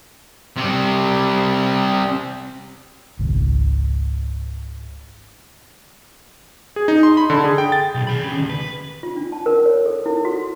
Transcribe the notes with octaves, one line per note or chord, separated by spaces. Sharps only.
C3 G3
G#1 C#2
G#4
D#4
C6
B5
D3
G#4
G5
A6
B1
G#4 B5
C#4 G4
D2 D3
B4
F4
D4
A5
A#4
C#5
A4
E4
F#4